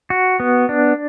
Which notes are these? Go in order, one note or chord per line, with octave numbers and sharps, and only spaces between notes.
F#4
B3
D4